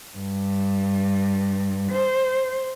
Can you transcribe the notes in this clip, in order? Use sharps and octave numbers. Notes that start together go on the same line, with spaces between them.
G2
C5